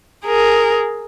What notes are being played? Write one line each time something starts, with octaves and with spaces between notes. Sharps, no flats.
G#4 A#4